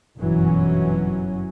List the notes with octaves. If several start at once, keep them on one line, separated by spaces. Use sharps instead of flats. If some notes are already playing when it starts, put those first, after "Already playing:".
G1 F#2 B2 E3 F#3 C#4